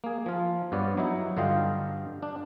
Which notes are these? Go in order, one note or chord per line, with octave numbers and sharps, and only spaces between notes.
A#3 G#4
F3 F4
G2 B3 C#5 D5
F#3 D#4 E4
G2 D3 F4 D#5 F5 G5
D4